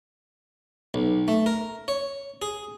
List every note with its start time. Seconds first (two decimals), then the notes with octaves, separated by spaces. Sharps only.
0.94 B1
1.28 A3
1.46 A#4
1.88 C#5
2.42 G#4